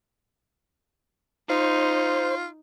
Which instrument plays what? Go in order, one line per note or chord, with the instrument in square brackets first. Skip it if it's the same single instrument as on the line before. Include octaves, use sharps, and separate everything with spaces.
[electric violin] D#4 [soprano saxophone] F4 [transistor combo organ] C5